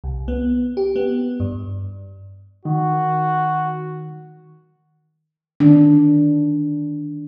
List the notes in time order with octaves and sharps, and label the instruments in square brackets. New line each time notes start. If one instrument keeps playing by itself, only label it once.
[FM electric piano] C2
B3
G4
B3
G2
[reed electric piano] D#3 [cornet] F#4
[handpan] D#3 D4